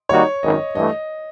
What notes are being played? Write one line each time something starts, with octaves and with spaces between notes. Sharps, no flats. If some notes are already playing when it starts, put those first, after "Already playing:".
D#3 G3 A#3 D#4 F#4 C#5
G#1 F#2 D#3 D#5
G2 E3 A3 D#5